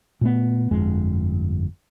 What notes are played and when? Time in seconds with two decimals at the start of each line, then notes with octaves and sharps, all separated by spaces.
0.21 A#2 A3 B3
0.71 G1 F2 G#3